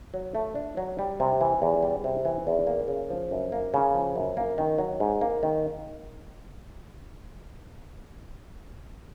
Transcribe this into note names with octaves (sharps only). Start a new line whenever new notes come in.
F#3
A3
D4
F#3
G3
C3
E3
E2
G3
C3
E3
E2
A#3
C#3
F3
F#2
A#3
C#3
F3
F#2
A#3
D#3
F#3
G#2
A#3
D#3